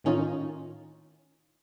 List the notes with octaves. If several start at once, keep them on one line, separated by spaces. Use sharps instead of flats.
A2 D#3 C#4 D#4 F4